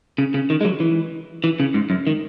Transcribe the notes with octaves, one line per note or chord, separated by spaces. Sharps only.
C#3
C#3
D#3
G#3
F#3
E3
E3
C#3
G#2
F#2
D#3